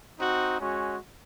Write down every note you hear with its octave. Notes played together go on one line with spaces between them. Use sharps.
C4 D#4 F#4
G#3 C#4 F#4